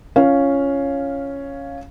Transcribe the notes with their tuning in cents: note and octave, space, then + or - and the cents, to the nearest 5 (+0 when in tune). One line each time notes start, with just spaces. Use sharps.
C#4 +0 F4 -35 F5 +0